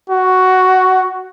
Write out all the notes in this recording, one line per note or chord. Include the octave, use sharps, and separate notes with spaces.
F#4